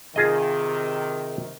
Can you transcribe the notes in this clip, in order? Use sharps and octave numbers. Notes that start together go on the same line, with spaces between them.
C3 D#3 F4 G#4 D#5